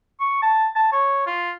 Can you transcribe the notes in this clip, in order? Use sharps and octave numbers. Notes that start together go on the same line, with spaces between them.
C#6
A5
A5
C#5
F4